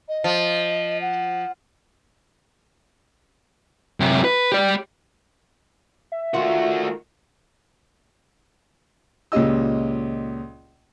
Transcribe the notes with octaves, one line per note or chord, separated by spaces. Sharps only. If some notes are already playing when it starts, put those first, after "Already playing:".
D#5
F3
F#5
F#2 C3
B4
G4 D5
E5
D#3 A3 F4 F#4
C#2 A#2 C#4 G4 D#5 E6